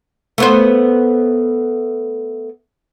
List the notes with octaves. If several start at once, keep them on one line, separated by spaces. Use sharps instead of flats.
A3 B3 C5